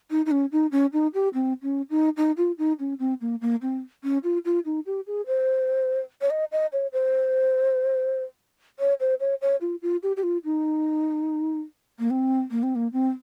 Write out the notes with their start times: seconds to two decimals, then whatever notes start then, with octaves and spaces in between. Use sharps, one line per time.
0.10 D#4
0.26 D#4
0.31 C#4
0.52 D#4
0.72 C#4
0.93 D#4
1.14 G4
1.34 C4
1.63 C#4
1.90 D#4
2.17 D#4
2.37 F4
2.58 D#4
2.79 C#4
2.99 C4
3.21 A#3
3.41 A#3
3.62 C4
4.04 C#4
4.24 F4
4.45 F4
4.65 D#4
4.86 G4
5.07 G#4
5.27 C5
6.21 C#5
6.30 D#5
6.52 D#5
6.73 C#5
6.93 C5
8.79 C#5
9.00 C5
9.20 C#5
9.42 C#5
9.61 F4
9.82 F4
10.03 G4
10.17 G4
10.23 F4
10.44 D#4
11.99 A#3
12.10 C4
12.51 A#3
12.63 C4
12.75 A#3
12.93 C4